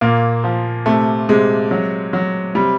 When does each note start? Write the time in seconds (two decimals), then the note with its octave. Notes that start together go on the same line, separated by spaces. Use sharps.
0.01 A#2 A#3
0.44 F3
0.86 C3 A3
1.29 C3 G#3
1.71 F#3
2.13 F#3
2.55 C3 G3